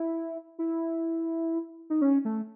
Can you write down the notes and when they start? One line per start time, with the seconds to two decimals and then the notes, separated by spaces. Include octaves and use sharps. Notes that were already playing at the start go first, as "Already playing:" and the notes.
Already playing: E4
0.59 E4
1.90 D#4
2.01 C#4
2.25 A3